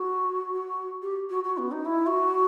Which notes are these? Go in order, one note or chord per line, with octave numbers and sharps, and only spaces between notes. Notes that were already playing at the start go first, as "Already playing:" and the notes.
Already playing: F#4
G4
F#4
F#4
B3
D#4
E4
F#4